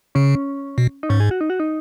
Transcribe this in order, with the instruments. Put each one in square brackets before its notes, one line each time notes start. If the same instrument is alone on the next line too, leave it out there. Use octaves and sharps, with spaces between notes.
[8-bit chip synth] C#3 [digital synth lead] C#4
[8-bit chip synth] B2
[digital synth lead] D#4
[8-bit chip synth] G#2 [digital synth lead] C#4
[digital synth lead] G#4
F#4
D#4
F#4
D#4